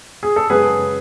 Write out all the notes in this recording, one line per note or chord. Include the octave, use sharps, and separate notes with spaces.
G#4
A4
F#2 C#3 G#3 B3 G#4 B4